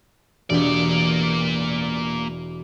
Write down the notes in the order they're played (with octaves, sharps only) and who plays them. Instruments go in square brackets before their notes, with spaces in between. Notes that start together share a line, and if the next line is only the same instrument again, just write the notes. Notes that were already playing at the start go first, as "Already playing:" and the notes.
[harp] E1 G4 G#5 [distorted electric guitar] A#3 D5